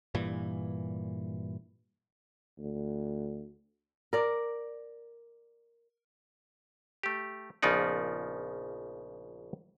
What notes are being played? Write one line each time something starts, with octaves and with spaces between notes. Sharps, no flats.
G2 A#2 E3
D2
A#4 D5
A3 G4
A#1 C#3 F3 B3 D#4 D5